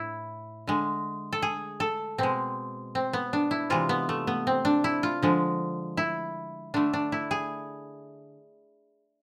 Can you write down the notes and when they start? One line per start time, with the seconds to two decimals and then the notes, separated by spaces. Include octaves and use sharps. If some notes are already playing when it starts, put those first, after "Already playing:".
Already playing: A2 E4
0.67 D3 G#3
1.33 A4
1.42 G#4
1.80 A4
2.18 B2 G#3 C4
2.95 C4
3.13 B3
3.33 D4
3.51 E4
3.70 C3 E3 G#3 F4
3.89 B3
4.09 A3
4.27 B3
4.47 C4
4.65 D4
4.84 E4
5.03 F4
5.22 D3 F3 G#3
5.97 E4
6.74 D3 A3 D4
6.93 D4
7.12 E4
7.31 G#4